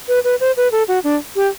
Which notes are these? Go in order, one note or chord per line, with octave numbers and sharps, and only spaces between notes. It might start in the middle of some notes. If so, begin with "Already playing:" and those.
B4
B4
C5
B4
A4
F#4
D4
G4